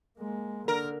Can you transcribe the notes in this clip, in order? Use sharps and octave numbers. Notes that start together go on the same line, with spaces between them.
G#3 A#3
D3 A#4